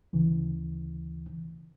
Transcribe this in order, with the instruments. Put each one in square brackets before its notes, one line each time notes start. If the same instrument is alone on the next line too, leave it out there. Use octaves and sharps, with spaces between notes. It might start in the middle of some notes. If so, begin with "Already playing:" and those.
[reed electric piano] D2 C#3 E3